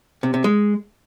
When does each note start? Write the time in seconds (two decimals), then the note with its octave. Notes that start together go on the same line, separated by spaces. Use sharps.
0.23 C3
0.34 C3
0.44 G#3